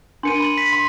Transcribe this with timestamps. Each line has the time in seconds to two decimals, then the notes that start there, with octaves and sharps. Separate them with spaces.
0.23 D4 A#4 G#5 C6 C#7 D#7
0.40 B5 D#7 F#7
0.58 B6
0.73 C6